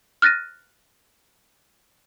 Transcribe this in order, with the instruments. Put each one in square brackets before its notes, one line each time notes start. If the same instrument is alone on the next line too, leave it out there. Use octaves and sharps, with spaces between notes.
[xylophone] F6 F#6 A6 A#6 D#7